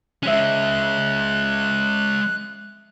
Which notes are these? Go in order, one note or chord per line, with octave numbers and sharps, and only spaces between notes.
G#3 C#4 E5 F#6 B6